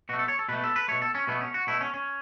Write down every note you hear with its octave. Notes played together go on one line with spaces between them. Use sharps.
B2 A3 F#4
A4
C#5
A4
B2 A3 B4
A4
B4
B2 A3 C#5
A4
C#4
B2 A3 B3
C#4
F#4
B2 A3 E4
C#4
C#4